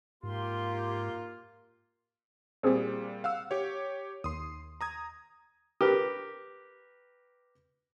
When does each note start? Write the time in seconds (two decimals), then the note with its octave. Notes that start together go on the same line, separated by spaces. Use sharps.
0.23 G#2 A#3 F4 G4 C6
2.63 A#2 G3 C4 G#4 C5
3.24 F5 F#5 E6
3.51 G4 C#5
4.24 D#2 C6 D#6
4.81 A#5 D#6 G#6
5.81 G4 A#4 B4